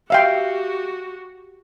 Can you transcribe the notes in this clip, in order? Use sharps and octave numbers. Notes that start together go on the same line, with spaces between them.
F#4 G4 E5 F5 G5